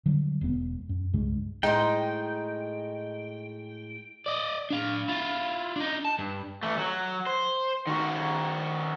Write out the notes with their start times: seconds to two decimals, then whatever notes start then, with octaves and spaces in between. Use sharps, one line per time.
0.06 D3 F#3 G3
0.41 E1 B3
0.89 F#2
1.13 C2 G2 C#3 G#3
1.63 A2 G#3 D#4 C5 G5
4.26 D5 D#5
4.70 D4 F5
5.08 E4 F4
5.76 D4 D#4
6.05 A5
6.19 G2
6.63 E3 A3
6.78 F#3
7.27 C5
7.87 D#3 F#4